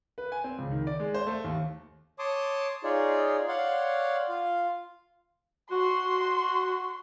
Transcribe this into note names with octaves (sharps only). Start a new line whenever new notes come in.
B4
G#5
C4
C#2
D#3
D5
G#3
C5
A3
D#2
C#5 A5 C6 D6 D#6
D#4 F4 G#4 C#5 D5
C#5 D5 F5 F#5 C6
F4 F5
F#4 C6